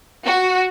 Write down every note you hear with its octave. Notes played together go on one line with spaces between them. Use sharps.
F#4